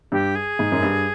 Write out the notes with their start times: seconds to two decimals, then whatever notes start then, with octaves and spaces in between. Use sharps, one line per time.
0.12 G2 G4
0.35 G#4
0.59 G#2
0.72 F#2
0.83 G2